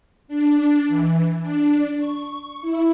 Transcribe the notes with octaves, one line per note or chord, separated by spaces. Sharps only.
D4
E3
D4
C#6
E4